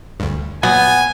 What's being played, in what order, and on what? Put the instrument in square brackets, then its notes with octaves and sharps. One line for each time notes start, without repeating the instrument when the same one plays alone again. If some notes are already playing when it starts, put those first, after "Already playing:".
[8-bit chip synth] D2 G2
[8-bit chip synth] A#2 F#3 [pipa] B3 [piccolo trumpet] G#5